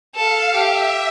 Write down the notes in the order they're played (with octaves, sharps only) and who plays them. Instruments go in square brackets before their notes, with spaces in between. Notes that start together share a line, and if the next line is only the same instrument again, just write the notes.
[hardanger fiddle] A4 [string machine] F5
[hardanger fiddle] G4 [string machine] E5